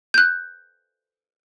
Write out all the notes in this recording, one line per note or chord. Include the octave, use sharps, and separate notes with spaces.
F#6 G6